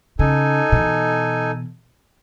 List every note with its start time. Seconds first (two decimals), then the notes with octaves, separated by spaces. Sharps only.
0.19 C#3 D#4 A4 G#5
0.72 B2 E3